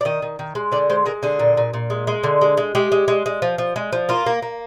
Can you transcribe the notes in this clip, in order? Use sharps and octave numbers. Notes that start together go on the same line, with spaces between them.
D5
D#3 D#5
D#3
D#3
G#3
D3 D5
G#3 C5
G#3 A#4
D3 G#4
A#2
A#2
A#2
G#3
G#3
D3
G#3
G#3
G#3 G4
G#3
G#3
G#3
F3
F3
G#3
F3
A#3 F4
A#3
A#3